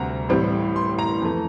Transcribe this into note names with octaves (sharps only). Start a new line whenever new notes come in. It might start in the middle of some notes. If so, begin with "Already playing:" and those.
Already playing: D2 C3 G3 A#5
A1 A2 G3 C4
C6
A#5
F2 E3 A3